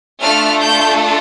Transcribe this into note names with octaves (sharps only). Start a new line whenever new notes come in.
A3 D4 F4 A4 F6
G6